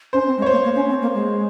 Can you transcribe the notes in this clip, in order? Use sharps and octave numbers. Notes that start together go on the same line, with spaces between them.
C#4 C5
C4
G#3
C#5
C5
A#3
A#3
C#4
C4
A#3
G#3